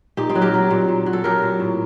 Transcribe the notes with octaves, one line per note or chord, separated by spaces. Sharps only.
A#2 D#4 G4
C4 D#4
F#3
G4 A#4
F#3
A#2
A#2
F#3
A4
F#3 G4 A#4
A#2
A2